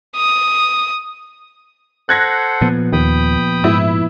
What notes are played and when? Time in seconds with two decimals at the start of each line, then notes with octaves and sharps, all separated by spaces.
0.16 D#6
2.09 A4 C5 F#5 F#6 G#6 A#6
2.61 A#2 F3 B3
2.93 D#2 G5 B5 D#6
3.64 G#2 E4